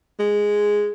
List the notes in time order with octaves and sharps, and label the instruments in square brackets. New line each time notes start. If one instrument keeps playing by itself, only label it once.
[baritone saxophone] G#3